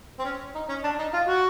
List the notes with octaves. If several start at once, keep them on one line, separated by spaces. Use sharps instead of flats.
C4
C#4
D#4
C#4
D4
D#4
F4
F#4